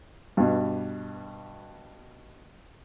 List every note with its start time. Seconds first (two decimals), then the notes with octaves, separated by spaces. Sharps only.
0.37 G2 B2